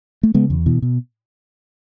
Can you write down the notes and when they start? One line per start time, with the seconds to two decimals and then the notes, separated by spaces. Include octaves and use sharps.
0.23 A3
0.34 C#3 G#3 B3
0.50 E2
0.66 B2 E3
0.82 B2